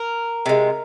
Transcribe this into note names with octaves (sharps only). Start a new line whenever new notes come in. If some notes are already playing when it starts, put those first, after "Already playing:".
Already playing: A#4
C3 G#3